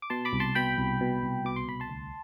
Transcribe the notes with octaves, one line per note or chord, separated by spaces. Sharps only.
D6
B2 A5 C6
B5 D6
C2
A5 C6
B2 G5 B5
C2
B2
C2
B2 D6
C6
C2 B5
A5 C6
D2